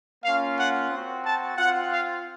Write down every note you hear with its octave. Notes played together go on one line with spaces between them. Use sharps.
A#3 C#4 F4 F5
F#5
C4 F#4
A5
C4 F4 F#5
F5